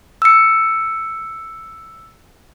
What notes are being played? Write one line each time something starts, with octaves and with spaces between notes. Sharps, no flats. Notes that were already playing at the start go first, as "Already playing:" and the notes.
E6 C#7